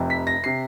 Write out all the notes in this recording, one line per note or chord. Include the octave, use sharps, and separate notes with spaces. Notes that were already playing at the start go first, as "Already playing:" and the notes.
Already playing: F1 F2 C3
B6
A#6
C3 C7